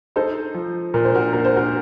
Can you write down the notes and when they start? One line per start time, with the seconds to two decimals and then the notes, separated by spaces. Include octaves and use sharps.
0.16 D#4 A4 C5
0.54 F3
0.94 A#2 A#4
1.05 C5
1.15 F#4 A#4
1.33 A#3 A#4
1.45 C5
1.56 F#4 A#4